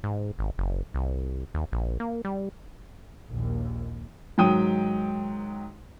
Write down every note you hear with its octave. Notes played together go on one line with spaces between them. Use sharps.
G#2
G#1
F#1
C2
D#2
A#1
A#3
G3
A#1 D#2
G#2 D#3 F#3 G5 D#6 D#7